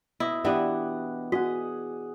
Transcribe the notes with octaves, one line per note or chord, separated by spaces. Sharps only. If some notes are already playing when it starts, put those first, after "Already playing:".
B2 E4 D#5
E3 B3 D4 E4 G4 D5 F#5
F#4 G#4 D#5 F#5